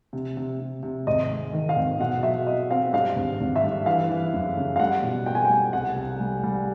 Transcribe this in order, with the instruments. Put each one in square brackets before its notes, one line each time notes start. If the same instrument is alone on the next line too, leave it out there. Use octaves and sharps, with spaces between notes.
[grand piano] C3
C3
C3
C3
[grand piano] G#1 [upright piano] D#5
[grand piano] G#3
D#3
[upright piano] F5
[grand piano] G#1
[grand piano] B2 [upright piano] F#5
[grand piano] F#3 [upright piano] E5
[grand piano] F#3 [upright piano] D#5
[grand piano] C4 [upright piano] F5
[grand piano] G2 [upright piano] F5
[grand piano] G#1
G#1
[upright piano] E5
[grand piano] G2
[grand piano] E3 [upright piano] F5
[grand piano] E3
F#2
C#3
[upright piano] F5
[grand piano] G3 [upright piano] F#5
[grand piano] B2
[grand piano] A#3 [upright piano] G5
[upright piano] G#5
G5
[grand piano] G3
[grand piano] C2 [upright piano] F#5
[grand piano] C2
G3
G3